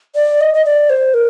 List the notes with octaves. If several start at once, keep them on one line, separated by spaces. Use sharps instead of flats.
D5
D#5
D#5
D5
C5
A#4